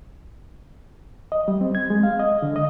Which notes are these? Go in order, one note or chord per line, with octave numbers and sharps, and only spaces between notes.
D#5
G3
C4
G#6
G#3
F5
D#5
D3
D#5